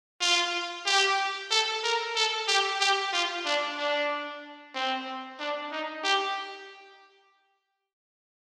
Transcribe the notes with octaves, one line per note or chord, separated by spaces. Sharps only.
F4
G4
A4
A#4
A4
G4
G4
F4
D4
D4
C4
D4
D#4
G4